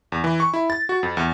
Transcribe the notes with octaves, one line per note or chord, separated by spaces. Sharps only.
E2
E3
C#6
E4
A6
F#4
F2
E2